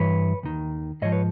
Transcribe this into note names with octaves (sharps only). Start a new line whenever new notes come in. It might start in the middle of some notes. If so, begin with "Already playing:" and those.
Already playing: G2 E3 B4 C#5
D#2 D#3
G#2 F3 C#5 D#5
B4 C#5